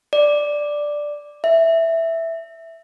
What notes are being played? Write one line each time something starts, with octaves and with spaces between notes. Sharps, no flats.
D5
E5